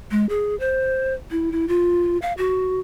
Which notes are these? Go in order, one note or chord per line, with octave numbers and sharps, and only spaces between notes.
G#3
G#4
C5
E4
E4
F4
F5
F#4